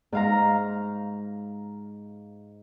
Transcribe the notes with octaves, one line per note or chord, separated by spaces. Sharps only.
G#2 F5 A#5